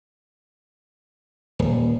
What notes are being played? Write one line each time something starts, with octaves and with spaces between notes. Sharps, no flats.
D#1